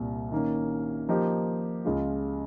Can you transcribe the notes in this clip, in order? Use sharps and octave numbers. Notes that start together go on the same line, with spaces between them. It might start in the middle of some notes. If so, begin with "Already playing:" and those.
Already playing: C2 A#2 G3
D#3 A#3 C#4
F3 A#3 D#4 G4
C#2 C#3 G#3 C#4 F4